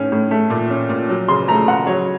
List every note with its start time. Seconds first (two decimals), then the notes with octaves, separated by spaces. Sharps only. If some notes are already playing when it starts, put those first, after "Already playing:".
Already playing: A2 D#3 C#4
0.12 A2
0.31 A3
0.50 A#2
0.70 C#4
0.89 A#2
1.09 F#3
1.28 C#3 C6
1.48 A3 A#5
1.67 C#3 F#5
1.87 F#3 C#5